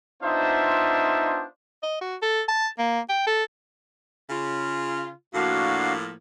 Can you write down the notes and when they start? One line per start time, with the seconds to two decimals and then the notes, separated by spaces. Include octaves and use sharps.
0.22 B3 D4 D#4 F4 C5 E5
1.83 D#5
2.01 F#4
2.22 A4
2.48 A5
2.79 A#3
3.09 G5
3.27 A4
4.30 C#3 F4
5.35 A2 F3 A#3 D4 F#4 F5